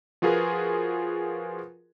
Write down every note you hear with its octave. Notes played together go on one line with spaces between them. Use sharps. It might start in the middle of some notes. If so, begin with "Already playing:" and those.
F3 F4 F#4 G#4 A#4 B4